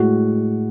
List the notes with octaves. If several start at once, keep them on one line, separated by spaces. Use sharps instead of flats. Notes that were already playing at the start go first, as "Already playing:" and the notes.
Already playing: A2 G#3 F#4